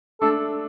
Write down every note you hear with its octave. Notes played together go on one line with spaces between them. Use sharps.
A3 D4 A4